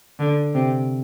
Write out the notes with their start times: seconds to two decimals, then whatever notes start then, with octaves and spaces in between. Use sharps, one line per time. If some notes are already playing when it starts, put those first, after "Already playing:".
0.19 D3
0.54 C3